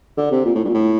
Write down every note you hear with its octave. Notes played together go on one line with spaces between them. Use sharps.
D3
C3
A#2
A2
G2
A#2
A2